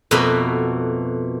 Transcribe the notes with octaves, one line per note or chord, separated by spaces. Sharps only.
F2 B2 A3 A#3 F#4 B5